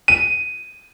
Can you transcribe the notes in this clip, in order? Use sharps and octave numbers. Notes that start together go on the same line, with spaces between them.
D#7